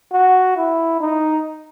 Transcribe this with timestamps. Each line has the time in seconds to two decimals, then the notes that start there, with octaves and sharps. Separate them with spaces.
0.12 F#4
0.57 E4
1.01 D#4